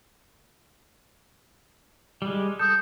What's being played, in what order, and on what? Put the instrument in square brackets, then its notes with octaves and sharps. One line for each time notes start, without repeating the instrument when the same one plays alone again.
[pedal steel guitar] G3 G#3
[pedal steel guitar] A4 [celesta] D#6 G6